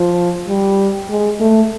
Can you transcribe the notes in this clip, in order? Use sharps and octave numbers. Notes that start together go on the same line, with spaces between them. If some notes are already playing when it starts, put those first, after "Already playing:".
Already playing: F3
G3
G#3
A3